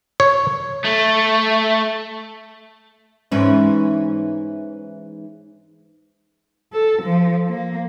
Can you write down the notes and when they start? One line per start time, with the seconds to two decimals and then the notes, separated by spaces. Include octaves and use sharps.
0.20 C#5
0.84 A3
3.32 G#2 E3 C#4
6.72 A4
7.02 F3
7.49 A#3